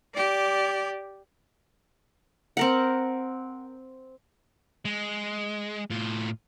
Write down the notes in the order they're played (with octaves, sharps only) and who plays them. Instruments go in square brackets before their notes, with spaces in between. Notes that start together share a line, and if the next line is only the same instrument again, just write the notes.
[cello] G4 D5
[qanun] C4 A#4 F#5
[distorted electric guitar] G#3
A2 F4